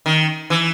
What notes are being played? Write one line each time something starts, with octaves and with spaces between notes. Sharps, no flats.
D#3
E3